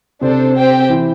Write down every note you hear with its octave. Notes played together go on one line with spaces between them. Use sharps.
C3 C4 D4 A4 C5
C4 G4 C5 G5
E3 E4